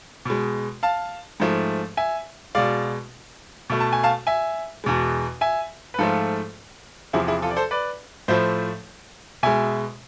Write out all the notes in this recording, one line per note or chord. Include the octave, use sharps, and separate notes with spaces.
B2 G#3
F5 A5
G#2 F3 A3
E5 G#5
B2 G#3 D5 F5
B2 A3
A5
G#5
F5 A5
E5 G#5
E2 B2 G#3
E5 G#5
B4
G#2 F3 A3 F4 A4
E2 C3 F3 E4 G#4
E4 G#4
F4 A4
D5
A4 C5
B4 D5
A2 F3 A3 C5 E5
B2 G#3 E5 G#5